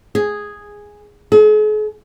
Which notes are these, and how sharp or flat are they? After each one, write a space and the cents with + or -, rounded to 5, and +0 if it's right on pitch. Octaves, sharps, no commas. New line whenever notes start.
G#4 -5
G#4 +45